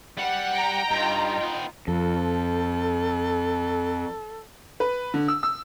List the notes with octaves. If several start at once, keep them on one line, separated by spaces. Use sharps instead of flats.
G3 F#5
G5 A#5
G2 D#4 F4
B3 G5
F2 A4
B4
D3
E6
E6